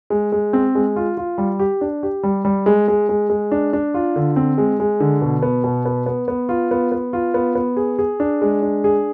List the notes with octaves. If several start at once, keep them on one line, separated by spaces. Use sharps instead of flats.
G#3
G#3
C4
G#3
F4
F4
G3
G4
D4
G4
G3
G3
G#3
G#3
G#3
G#3
D4
D4
F4
D3
C4
G#3
G#3
D3
B2
B3
B2
B3
B3
B3
F4
B3
B3
F4
B3
B3
G#4
G#4
D4
G#3
D4
G#4